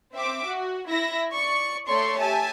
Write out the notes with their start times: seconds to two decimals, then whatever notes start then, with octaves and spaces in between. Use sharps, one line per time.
0.14 C4 E5 D6
0.46 F#4
0.88 E4 E5 A#6
1.31 D5 C#6
1.88 A3 A4 C#5 D5 C6 C#6
2.20 G4 E5 G#5 A5